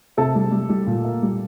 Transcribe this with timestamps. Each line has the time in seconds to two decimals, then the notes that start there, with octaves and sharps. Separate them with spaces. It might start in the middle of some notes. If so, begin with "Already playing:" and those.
0.17 C3 A4
0.35 G3
0.52 G3
0.69 G3
0.87 A#2
1.04 A#3
1.22 G3